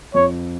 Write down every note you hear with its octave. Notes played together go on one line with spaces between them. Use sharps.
F2 C#5